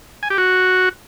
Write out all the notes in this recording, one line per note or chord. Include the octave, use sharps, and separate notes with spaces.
G#5
G4
F#4